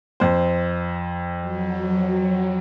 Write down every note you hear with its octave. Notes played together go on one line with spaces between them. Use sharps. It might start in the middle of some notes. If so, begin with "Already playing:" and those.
F2 C5
F#3